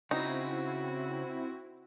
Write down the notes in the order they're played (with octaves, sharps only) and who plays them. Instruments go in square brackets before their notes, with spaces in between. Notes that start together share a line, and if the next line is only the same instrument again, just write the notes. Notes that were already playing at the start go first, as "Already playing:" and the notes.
[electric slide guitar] C#3 [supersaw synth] C4 E4 [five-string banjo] D#4 [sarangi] F#4